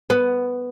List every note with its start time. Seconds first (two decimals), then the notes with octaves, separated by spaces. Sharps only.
0.10 B3